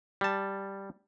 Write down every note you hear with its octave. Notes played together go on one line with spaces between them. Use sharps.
G3 A5